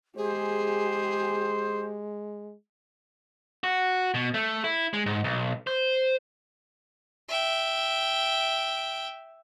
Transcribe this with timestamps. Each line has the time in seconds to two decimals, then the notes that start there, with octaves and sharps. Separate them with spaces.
0.17 G#3 G4 G#4 C5
3.64 F#4
4.14 B2
4.34 A3
4.64 E4
4.93 G#3
5.06 G#2
5.24 B1
5.67 C5
7.29 E5 G5